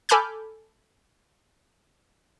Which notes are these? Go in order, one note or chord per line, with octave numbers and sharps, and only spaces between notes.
A4 G#5 B5 D6 F6 G6